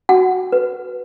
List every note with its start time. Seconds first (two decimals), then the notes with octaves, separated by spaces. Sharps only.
0.09 F#4 F#5
0.52 B4